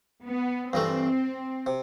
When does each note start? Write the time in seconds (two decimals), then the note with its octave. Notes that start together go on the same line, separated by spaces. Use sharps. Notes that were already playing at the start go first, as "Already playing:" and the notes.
0.27 B3
0.73 G2 E3 A3 C4
1.66 C3